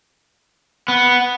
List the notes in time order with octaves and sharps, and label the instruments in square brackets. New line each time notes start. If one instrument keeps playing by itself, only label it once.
[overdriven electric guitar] B3